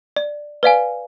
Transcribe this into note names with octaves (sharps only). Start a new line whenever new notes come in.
D5
B4 D5 F5 G#5